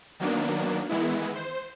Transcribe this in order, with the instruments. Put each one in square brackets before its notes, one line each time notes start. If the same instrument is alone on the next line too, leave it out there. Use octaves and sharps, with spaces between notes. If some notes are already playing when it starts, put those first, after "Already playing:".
[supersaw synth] D#3 F#3 A#3 B3 D4
D#3 E3 G#3 B3 E4
C5